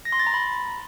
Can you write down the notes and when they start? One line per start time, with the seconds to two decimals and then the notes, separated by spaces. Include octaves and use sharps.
0.05 A#6
0.12 C6
0.20 A6
0.27 A#5
0.34 B5